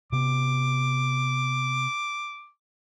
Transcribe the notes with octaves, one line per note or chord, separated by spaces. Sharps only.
C3 B3 D6